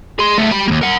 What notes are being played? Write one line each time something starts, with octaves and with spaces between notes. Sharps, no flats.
G#4 C6
A3 B3
G4 B5
D#2 A#3
A#4 F#5